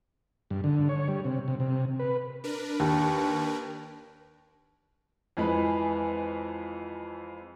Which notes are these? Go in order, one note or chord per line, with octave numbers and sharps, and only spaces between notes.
G2
D3
C#5
G3
C3
C3
C3
B4
D4 A#4 B4
D#2
F2 E3 G#3 G#4 B4